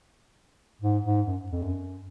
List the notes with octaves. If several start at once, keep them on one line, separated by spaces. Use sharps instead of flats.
G#2
G#2
F#2
F2
F#2